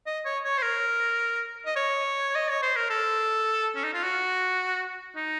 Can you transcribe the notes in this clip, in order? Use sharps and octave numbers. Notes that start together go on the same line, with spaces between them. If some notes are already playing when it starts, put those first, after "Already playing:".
D#5
C#5
C#5
C5
A#4
D#5
C#5
D#5
C#5
C5
A#4
A4
C#4
D#4
F4
F#4
D#4